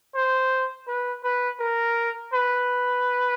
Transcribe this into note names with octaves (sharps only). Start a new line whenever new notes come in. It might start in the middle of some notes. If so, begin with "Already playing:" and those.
C5
B4
B4
A#4
B4